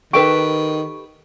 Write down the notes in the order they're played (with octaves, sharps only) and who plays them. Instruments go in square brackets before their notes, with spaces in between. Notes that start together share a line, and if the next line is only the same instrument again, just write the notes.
[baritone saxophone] D#3 [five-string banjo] G4 A4 B4 [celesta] C#6 D7